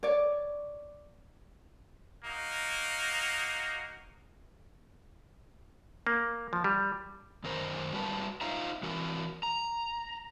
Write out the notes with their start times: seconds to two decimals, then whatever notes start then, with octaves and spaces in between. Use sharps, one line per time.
0.03 C#5 D5
2.24 A#3 D#4 F#4
6.07 A#3
6.53 F3
6.64 G3
7.44 F#2 D#3 A#4 C5
7.93 G3 F#4 B4 A5
8.41 D#4 F4 C5 E5 F5 A#5
8.83 E3 F#4 A#4
9.43 A#5